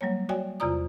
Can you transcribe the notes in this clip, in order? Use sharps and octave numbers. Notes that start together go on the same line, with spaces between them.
F#3 G3 A#3 C#5
F#4 C#5 D5 E5 G5 G#5
E2 C3 F4 D5 A#5 D#6